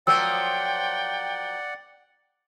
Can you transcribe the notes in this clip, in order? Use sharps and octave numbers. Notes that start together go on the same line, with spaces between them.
F3 F#3 A#3 D5 F#5 G5 E6